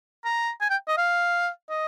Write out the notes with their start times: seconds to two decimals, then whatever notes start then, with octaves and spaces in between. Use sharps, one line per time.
0.25 A#5
0.61 G#5
0.70 G5
0.88 D#5
0.98 F5
1.70 D#5